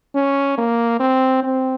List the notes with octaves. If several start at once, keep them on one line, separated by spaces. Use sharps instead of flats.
C#4
A#3
C4
C4